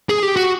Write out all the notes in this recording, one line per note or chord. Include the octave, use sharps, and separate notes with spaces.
G#4
G4
F#4